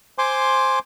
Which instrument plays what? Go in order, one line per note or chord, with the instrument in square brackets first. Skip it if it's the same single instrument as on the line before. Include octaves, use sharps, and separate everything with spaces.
[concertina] C5 G#5 C6 D6